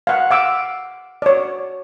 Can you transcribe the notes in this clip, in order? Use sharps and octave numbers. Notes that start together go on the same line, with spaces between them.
F5 F#5
F5 D6 E6
C#5 D5